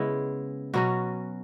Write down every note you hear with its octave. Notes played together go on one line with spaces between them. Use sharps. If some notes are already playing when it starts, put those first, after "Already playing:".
Already playing: C#3 G#3 B3 E4
B2 F#3 C#4 F#4